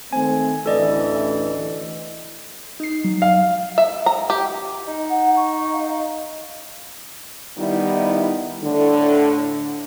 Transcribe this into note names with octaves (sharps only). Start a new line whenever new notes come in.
D#3 A3 C4 G#5
A1 D2 E3 A4 D5 D#5
D#4 C7
F#3
F5
E5
A#5
G4
D#4
F#5
C#6
F5
D#3 G3 B3 D#4 E4
A2 D3